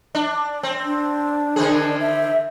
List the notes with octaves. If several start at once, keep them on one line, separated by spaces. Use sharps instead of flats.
D4
C4
D4
D3 C4 G#4
E5